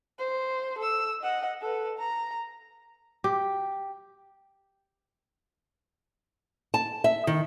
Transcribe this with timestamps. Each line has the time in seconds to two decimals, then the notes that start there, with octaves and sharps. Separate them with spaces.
0.19 C5
0.78 A4 E6
1.21 D#5 F#5
1.61 A4 B4
1.98 A#5
3.24 G4
6.74 A5
7.04 E5
7.27 D#3